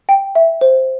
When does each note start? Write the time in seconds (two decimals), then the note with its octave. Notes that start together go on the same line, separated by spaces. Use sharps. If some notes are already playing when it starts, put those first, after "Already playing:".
0.09 G5
0.35 E5
0.61 C5